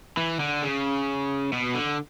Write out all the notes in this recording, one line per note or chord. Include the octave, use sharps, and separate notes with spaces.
E3
D3
C#3
B2
D3